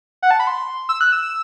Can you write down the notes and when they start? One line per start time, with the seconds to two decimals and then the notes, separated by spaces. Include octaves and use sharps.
0.22 F#5
0.31 A5
0.40 B5
0.47 C6
0.89 E6
1.01 F#6
1.12 E6
1.22 E6